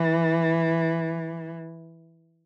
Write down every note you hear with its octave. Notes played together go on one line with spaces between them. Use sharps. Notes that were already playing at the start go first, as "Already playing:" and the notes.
Already playing: E3